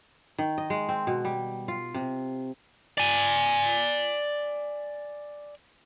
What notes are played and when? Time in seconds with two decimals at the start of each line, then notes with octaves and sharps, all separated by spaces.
0.38 D#3
0.58 D#5
0.70 G#3
0.89 C4
1.07 B2
1.25 G3
1.68 F4
1.94 C3
2.98 D5 G#5